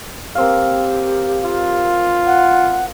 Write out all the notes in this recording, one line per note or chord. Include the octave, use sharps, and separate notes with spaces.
A#3 C4 G4 F5
F4
F#5